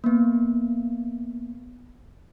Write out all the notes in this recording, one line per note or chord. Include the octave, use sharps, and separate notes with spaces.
A#3 B3